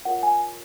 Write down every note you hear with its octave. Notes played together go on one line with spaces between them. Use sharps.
F4 A#4 C#5 F#5
G#5